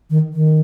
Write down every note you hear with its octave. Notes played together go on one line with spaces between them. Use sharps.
D#3
D#3